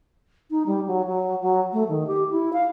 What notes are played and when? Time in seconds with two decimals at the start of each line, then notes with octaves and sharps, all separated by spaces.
0.50 D#4
0.66 G3
0.87 F#3
1.05 F#3
1.41 F#3
1.73 A3
1.88 D#3
2.07 G4
2.31 E4
2.53 F5